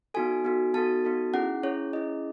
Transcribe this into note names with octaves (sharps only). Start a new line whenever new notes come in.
B3 D#4 F#4 A4 G#5
B3 D#4 F#4 A4
B3 D#4 F#4 A4 A5
B3 D#4 F#4 A4
C#4 E4 G#4 F#5
C#4 E4 G#4 C#5
C#4 E4 G#4 D#5